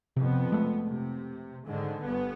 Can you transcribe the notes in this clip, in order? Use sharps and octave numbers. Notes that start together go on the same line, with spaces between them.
F2 C3 B3
G#3 A3
C3
G#2 D3 D#3
G1 B3